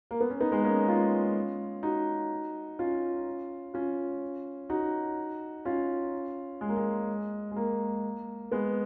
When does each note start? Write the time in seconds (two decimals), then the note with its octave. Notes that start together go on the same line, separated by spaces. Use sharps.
0.11 A#3
0.20 B3
0.30 C#4
0.41 B3 D#4
0.52 G#3 B3
0.64 A#3 C#4
0.88 C#4 F4
1.83 D#4 F#4
2.79 C#4 F4
3.74 C#4 F4
4.70 D#4 F#4
5.65 C#4 F4
6.61 G#3
6.69 A#3
6.77 G#3
7.51 G#3
7.56 A#3
8.51 G#3 B3